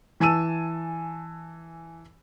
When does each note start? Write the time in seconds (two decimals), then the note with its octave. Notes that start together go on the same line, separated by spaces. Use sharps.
0.20 E3 G#5 A5 E6 D#7